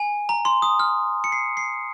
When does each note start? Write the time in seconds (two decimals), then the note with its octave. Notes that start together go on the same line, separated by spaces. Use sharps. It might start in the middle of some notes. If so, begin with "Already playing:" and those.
Already playing: G#5
0.29 A#5
0.45 C6
0.62 D#6
0.80 F6
1.24 C#7
1.32 C7
1.57 C7